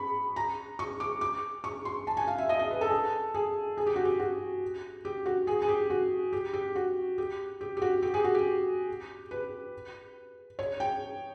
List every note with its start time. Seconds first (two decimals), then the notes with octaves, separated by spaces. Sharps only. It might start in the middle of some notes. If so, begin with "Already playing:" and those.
Already playing: B5 C#6
0.36 A#5
0.79 C#6
1.00 D6
1.21 D6
1.64 C#6
1.85 C6
2.07 A5
2.17 G#5
2.28 F5
2.38 E5
2.49 D#5
2.59 D#5
2.71 B4
2.81 A4
2.87 G#4
2.92 A4
3.34 G#4
3.77 G#4
3.87 G4
3.96 F#4
4.05 G4
4.19 F#4
5.05 G4
5.26 F#4
5.47 G#4
5.62 G#4
5.69 G4
5.90 F#4
6.33 G4
6.53 G4
6.76 F#4
7.18 G4
7.61 G4
7.77 G4
7.82 F#4
8.02 G4
8.14 G#4
8.24 F#4
8.35 G4
9.31 B4
10.59 C#5
10.80 G5